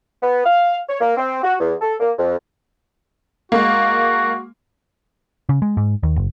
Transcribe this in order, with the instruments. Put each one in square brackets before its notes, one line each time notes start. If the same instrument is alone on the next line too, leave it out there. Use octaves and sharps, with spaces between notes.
[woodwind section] B3
F5
C#5
A#3
C4
F#4
E2
A4
A#3
F2
[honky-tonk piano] G#3 A#3 [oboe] F#4
[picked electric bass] C#3
G#3
G#2
D#2
F#1